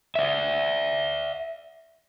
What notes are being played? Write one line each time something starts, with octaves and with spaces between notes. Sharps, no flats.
D5 E5